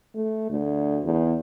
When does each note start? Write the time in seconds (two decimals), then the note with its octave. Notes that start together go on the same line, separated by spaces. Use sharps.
0.15 A3
0.51 D2
1.05 E2